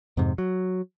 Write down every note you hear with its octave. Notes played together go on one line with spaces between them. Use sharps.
F2 G#2 C3
F#3